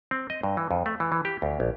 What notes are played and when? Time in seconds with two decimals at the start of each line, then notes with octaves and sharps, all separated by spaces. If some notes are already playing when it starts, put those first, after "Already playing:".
0.11 C4
0.30 D#5
0.43 G2
0.57 E3
0.71 F2
0.86 A3
1.00 E3
1.12 E3
1.25 G4
1.42 D2
1.60 A#1